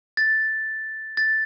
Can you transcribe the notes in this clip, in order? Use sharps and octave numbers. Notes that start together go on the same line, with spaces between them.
A6
A6